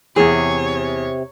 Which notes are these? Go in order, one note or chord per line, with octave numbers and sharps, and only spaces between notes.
E2 C3 E3 G#4 C#5